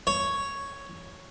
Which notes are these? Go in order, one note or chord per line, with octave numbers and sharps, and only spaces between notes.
C#5